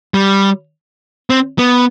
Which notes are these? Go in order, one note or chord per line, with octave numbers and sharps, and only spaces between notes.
G3
C4
B3